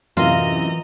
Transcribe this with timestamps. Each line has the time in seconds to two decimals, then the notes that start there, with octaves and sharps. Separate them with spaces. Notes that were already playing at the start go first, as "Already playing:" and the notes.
0.17 F#2 A2 C3 E3 F4 D#5 A#5